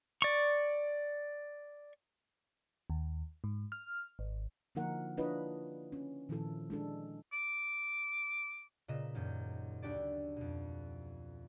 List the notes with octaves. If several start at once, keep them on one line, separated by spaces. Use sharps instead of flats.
D5 C#6
D#2
G#2
F6
G#1
D3 F3 A#3 D#4 A#4 F#5
D4 E4 F4 B4 C#5 D#5
C#4
A#2 D#3 F3 E4 A4
G#3 D4 A4
D6
A#2 C#3 B4 D#5 E7
D#1 F#2 G6
D2 D4 F#4 G4 A4 D5
F2 B2